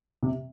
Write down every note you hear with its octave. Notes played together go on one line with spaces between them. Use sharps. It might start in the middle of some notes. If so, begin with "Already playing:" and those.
C3